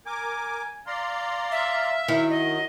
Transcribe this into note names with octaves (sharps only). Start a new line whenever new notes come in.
A#4 G#5 D6
D5 F5 A#5 C6
E5
D#3 F#3 E4
D#5